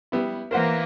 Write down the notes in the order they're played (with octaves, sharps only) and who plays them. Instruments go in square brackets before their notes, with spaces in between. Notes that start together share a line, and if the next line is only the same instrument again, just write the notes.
[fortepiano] G3 B3 E4
[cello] E3 A#3 [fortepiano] A#4 C5 F#5